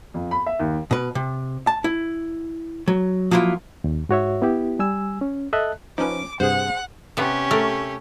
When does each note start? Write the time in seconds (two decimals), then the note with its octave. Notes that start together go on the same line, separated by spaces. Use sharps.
0.14 F2
0.31 B5
0.46 E5
0.60 D#2
0.91 B2 B4
1.15 C3
1.67 A5
1.84 E4
2.88 F#3
3.31 F3 F#3 A#3 E4 F4
3.84 D#2
4.09 G#2 F#4 C#5 E5
4.42 B3 E4 G4
4.79 G3 G#5 E6
5.21 C#4
5.53 A4 D#5 E5 A5 F#6
5.98 F3 C#4 D#4 B4 D6
6.40 G2 C3 G#4 C5 F#5
7.17 C3 B3 C#4 G4
7.51 A3 A#4